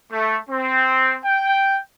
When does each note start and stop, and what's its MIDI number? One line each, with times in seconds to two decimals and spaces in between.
0.12 0.38 57
0.50 1.16 60
1.25 1.78 79